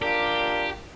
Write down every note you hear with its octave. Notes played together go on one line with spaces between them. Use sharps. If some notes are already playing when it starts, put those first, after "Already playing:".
D4 F4 G4 A#4